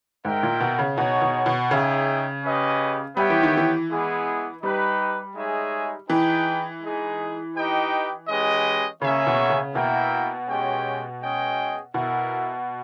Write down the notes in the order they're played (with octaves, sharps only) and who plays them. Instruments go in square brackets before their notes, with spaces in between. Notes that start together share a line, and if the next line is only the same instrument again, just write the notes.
[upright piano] G#2 [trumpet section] D#4 A#4 E5 G5
[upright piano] A#2
B2
C#3
[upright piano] B2 [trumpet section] D#4 G#4 C#5
[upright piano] B2
B2
[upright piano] C#3 [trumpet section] D#4 G#4 C#5 E5 G5
[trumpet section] C#4 G4 B4 D#5
[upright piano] G3 [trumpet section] B3 G4 C#5 E5 G5
[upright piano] E3
D#3
E3
[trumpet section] G#3 B3 E4 G#4
[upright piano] G3 [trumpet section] D#4 G4 B4
[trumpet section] G#3 D#4 G#4 C#5 E5
[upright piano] E3 [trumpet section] D#4 G#4 B4 G5
[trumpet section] G#3 D#4 G#4
D#4 G4 B4 D#5 G5
G#3 C#4 G4 B4 D#5
[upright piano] C#3 [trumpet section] A#3 C#4 G#4 C#5 E5
[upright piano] B2
C#3
[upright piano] B2 [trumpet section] A#3 E4 A#4 E5 G5
[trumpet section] G#3 C#4 G4 C#5 G5
G#3 C#4 G#4 D#5 G5
[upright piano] B2 [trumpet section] E4 A#4 E5